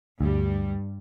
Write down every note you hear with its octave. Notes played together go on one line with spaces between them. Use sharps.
D2 G2 G3